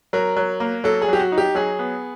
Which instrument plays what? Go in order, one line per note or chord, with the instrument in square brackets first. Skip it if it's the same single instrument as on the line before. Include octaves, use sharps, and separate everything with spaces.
[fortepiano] F#3 [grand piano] A#4
[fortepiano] F#3
A#3
[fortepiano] F#3 [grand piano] A4
[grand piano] G#4
[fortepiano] F#3 [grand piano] G4
[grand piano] F#4
[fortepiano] D#4
[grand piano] G4
[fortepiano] F#3 [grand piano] G#4
[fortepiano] B3